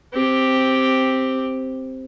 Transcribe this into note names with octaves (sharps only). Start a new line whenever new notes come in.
C4 G4